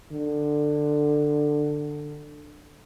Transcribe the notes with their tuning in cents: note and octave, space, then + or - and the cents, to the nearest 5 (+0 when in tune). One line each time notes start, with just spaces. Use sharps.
D3 +15